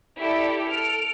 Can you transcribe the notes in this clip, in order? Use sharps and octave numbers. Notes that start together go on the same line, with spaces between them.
E4 G4 A4 D5
A4 F6 D7